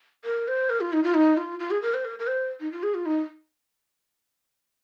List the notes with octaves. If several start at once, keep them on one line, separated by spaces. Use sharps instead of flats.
A#4
C5
A#4
F4
D#4
F4
D#4
F4
F4
G#4
A#4
C5
A#4
A#4
C5
D#4
F4
G#4
F4
D#4